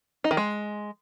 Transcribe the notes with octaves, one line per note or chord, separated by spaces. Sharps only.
D#4
D#3
G#3